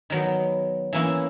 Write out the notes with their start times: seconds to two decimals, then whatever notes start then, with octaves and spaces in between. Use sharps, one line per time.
0.10 D#3 F#3 B3
0.93 E3 A#3 C#4 E4